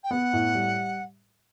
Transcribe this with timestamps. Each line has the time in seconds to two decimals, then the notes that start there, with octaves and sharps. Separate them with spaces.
0.04 G5
0.11 B3 F#5
0.33 A2
0.55 G3